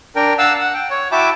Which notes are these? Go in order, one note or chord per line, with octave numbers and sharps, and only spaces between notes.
D4 A#4 G5
F5 F#5 A5 E6
F#5
G5
C#5
E4 F#4 E5 G5 A5 D6